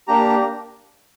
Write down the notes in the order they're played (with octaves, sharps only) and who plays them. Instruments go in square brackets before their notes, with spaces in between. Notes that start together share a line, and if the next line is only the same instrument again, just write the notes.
[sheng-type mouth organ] A#3 D4 G4 A#5